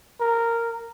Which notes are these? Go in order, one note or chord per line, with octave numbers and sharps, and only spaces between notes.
A#4